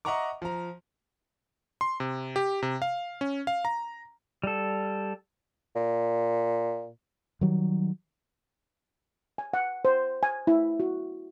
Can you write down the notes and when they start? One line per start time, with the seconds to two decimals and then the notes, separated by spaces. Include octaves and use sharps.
0.05 D#5 E5 F#5 A#5 C#6 D6
0.42 F3 A#5
1.81 C6
2.00 C3
2.36 G4
2.63 C3
2.82 F5
3.21 C#4
3.47 F5
3.65 A#5
4.44 G3 A4
5.76 A#2
7.41 D#3 F#3 G3
9.38 G#5
9.54 F#5
9.85 C5
10.23 G#5
10.47 E4
10.80 F#4